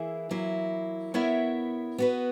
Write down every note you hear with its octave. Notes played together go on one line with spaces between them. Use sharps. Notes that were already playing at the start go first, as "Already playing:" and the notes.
Already playing: E3 A#3 E4 G#4
F#3 A#3 E4
B3 E4 A#4 C#5 E5
B3 F#4 B4